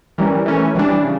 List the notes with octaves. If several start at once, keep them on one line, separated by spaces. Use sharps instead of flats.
E3 G3 C#4 A#4
E3 A3 C#4
E3 G3 D4
C#3